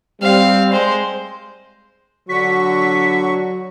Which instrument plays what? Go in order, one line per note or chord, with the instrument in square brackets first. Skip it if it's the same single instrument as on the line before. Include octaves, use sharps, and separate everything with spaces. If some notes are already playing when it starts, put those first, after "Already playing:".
[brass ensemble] G3 C4 [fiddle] F5
[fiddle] G#3 C5
[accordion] D3 F#4 C#6 [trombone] F#3 [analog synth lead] B6